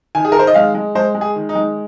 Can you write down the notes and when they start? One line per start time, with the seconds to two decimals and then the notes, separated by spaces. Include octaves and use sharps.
0.15 D#3 G#5
0.25 G#4
0.32 A#4
0.35 D#3 C5
0.47 D#5
0.54 G#3 F5
0.75 G#3
0.95 G#3 C5
1.15 G#3
1.21 G#4
1.36 D#3
1.49 D#4
1.55 G#3